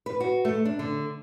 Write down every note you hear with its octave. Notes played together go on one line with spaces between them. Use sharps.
B4
F#4
A3
D4
D3